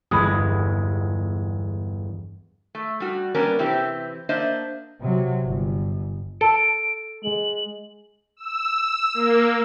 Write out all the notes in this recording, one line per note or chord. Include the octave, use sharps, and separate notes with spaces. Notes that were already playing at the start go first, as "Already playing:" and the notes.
G1 E2 G#3 B5 D#6
A3
G3 F#4
G3 A#3 B3 C#4 D4 A#4
C3 E3 C4 E4 G4
A#3 D4 C5 D#5 E5
C3 F#3
G1
A4 D7
G#3 F#7
E6
A#3